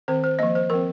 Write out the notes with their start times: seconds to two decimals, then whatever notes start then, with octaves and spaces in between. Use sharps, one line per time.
0.08 D#3 C4 C5
0.24 C5
0.39 F3 A#3 D#5
0.55 C5
0.70 F3 C4 A#4